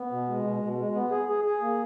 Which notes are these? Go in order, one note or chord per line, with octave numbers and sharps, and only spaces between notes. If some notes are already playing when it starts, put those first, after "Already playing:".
Already playing: B3
B2
G#3
B2
B2
G#3
B3
G#4
G#4
G#4
A#3